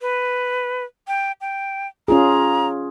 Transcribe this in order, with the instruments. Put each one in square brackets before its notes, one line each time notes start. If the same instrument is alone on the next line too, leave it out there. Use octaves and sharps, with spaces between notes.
[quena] B4
G5
G5
[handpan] C#4 F4 G#4 [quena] A#5